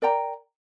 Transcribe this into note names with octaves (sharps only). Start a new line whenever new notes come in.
A#4 D5 G5 A#5